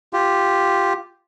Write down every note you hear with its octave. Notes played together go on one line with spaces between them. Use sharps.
F4 G4